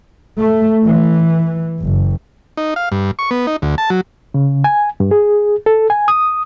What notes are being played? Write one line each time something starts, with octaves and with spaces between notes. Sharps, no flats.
A3
E3
F#1
D#4
F5
G2
C#6
B3
D#4
D2
A5
F#3
C#3
G#5
G2
G#4
A4
G#5
D#6